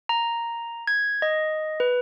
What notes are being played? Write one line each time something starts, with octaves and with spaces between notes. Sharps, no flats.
A#5
G#6
D#5
B4